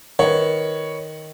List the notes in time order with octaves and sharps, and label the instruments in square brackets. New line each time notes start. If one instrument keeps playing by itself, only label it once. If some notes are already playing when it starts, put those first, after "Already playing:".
[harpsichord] D#3 [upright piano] B4 C#5